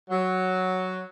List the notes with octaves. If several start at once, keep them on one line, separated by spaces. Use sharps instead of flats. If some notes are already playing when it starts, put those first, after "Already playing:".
F#3